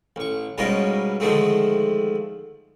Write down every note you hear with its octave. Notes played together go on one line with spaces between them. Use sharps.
A1 C#6
G#2 B2 G3 C#4 F4 A#4
D3 D#3 F3 G#3 A3 C4